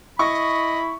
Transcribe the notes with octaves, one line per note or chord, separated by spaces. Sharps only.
E4 D#5 B5 C#6